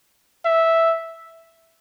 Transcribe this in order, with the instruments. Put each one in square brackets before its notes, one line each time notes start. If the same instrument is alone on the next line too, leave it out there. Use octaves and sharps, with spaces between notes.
[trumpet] E5